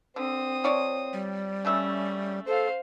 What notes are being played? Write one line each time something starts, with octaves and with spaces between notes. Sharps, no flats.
D3 C4 D#6
F3 C#5 D5
G3
C#3 A3 C#4 E5
A4 C5 F5